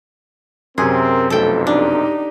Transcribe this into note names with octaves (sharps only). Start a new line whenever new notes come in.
F#2 C3 C4 G#4 A#4
B1 F2 A3 A4 G5
D4 D#4 G4